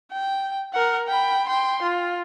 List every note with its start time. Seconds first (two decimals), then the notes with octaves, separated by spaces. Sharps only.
0.12 G5
0.73 A#4 F#5
1.07 G5 B5
1.48 G5 C6
1.82 F4